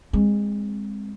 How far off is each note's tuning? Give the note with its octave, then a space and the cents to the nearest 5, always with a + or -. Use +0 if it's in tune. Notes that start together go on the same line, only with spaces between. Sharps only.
G#3 -20 C4 +10